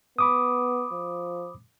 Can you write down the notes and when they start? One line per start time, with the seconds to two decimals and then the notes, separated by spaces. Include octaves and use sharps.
0.19 B3 B5 D6 D#6
0.92 F3